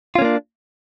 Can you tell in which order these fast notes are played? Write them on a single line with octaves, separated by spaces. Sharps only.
F4 C#4 A#3 D4